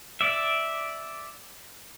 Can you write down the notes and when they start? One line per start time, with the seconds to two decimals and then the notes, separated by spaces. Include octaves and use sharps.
0.21 D5 E5